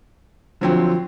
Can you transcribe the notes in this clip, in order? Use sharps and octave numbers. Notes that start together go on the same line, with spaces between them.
D3 F3 F#3 C4